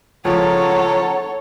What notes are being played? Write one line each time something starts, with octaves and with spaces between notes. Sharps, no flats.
C#2 F3 A4 C#5 F#5 A5 A#5